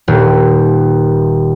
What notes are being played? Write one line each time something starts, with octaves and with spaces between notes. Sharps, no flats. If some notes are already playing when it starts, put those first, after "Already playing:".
D#1